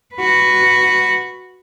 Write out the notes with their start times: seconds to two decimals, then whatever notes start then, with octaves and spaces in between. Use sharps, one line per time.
0.15 F#4 B4